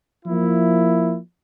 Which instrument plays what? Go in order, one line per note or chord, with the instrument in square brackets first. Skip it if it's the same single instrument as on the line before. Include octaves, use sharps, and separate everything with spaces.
[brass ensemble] F3 A#3 E4